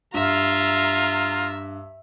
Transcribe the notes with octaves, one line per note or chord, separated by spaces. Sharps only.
G2 F4 E5 A#5